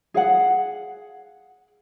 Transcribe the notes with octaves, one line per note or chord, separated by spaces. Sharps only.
G#4 F5 F#5